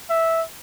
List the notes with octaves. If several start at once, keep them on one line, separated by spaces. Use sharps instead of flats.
E5